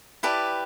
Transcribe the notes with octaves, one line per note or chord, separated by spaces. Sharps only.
E4 G4 B4 D5 A5